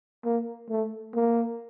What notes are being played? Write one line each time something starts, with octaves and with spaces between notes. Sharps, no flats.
A#3
A3
A#3